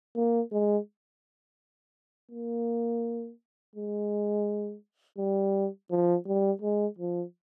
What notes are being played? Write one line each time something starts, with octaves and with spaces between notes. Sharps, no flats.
A#3
G#3
A#3
G#3
G3
F3
G3
G#3
F3